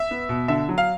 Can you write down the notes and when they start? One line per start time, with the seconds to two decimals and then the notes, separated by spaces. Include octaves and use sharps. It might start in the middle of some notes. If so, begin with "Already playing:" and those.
Already playing: E5
0.11 B3
0.29 B2
0.48 D3 E5
0.69 F#3
0.78 F5